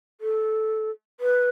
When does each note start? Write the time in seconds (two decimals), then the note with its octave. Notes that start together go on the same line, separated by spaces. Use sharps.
0.21 A4
1.20 B4